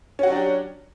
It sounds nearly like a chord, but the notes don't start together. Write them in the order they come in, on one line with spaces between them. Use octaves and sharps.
C#4 F#4 F#3 D4 G4